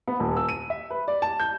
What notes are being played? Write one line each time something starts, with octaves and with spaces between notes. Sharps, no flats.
B3
D#1
E6
D#7
E5
B4
D5
A5
G6